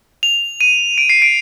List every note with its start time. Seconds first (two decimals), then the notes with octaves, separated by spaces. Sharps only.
0.23 F7
0.61 D#7
0.98 D7
1.09 C7
1.22 D7